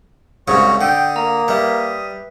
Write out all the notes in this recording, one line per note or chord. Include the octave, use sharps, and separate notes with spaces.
C2 G#2 C#3 F#4 C#5
D3 G5 D#6
A#3 A#5
G3 B4 E5